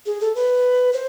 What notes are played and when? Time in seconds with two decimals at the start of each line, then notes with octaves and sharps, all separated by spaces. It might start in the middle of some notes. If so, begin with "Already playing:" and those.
0.06 G#4
0.21 A4
0.35 B4
0.93 C5